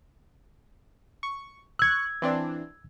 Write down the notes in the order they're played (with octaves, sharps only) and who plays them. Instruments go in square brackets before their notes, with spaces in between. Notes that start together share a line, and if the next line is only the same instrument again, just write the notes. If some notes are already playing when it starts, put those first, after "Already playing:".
[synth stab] C#6
[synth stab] C#6 F#6 [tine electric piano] E6 G#6
[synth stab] E3 C4 D4